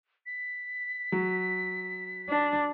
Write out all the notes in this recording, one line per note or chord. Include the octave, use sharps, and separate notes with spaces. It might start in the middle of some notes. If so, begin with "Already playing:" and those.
B6
F#3
D4